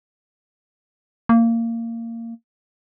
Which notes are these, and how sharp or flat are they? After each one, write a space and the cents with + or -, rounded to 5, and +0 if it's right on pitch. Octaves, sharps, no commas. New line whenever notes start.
A#3 -20